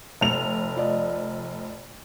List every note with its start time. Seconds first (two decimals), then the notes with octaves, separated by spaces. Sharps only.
0.21 F1 F7
0.76 F4 D5 D#5